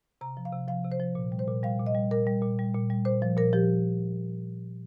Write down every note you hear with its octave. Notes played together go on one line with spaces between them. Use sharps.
C3 A#5
F3
F5
C3
F3 F5
C3
C5
F3
A#2
G3
C5
A#2
G3 F5
A#2
D#5
G3
A#2 A#4
G3
A#2
G3
A#2
G3
A#2 C5
F3
A#2 A#4
F3 G4